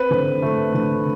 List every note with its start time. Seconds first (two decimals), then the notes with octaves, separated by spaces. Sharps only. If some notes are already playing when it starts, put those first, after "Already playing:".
Already playing: C4 B4
0.11 D3
0.42 A3
0.74 D3